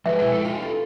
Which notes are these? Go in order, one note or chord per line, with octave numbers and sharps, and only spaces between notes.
F3 G#3 G#4 B4 E5
B2 G#3 E4 G5 G#5
A4 G5
D#4 F4 F5
A4